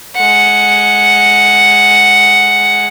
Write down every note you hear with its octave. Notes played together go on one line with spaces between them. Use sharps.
G#3 F#5